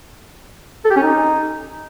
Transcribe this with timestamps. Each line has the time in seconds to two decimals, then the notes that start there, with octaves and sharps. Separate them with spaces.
0.85 A4
0.91 G4
0.96 C#4
1.02 D#4